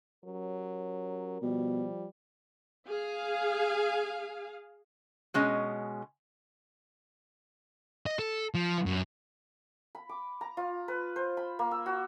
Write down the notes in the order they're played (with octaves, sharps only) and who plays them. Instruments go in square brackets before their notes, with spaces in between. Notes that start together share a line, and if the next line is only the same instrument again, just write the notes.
[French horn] F#3 [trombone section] C#4 G4 A#4
[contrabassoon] B2 [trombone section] F3 [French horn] G3
[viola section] G#4 F5
[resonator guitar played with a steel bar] B2 G#3 C#4 D#5
[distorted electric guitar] D#5
A4
F3
F#2
[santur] B5
D6
A#5
F4
B4
C5
B5
A#3
E6
F#4